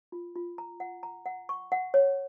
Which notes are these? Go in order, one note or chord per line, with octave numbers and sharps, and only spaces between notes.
F4
F4
A#5
F#5
A#5
F#5
C#6
F#5
C#5